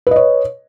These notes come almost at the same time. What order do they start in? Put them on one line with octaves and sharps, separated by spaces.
B4 D#5 C#5